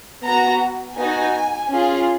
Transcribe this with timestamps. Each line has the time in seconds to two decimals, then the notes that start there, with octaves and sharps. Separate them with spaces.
0.24 B3 F#4 A#5
0.97 B3 D#4 F#4 G#5
1.70 C#4 F4 G#4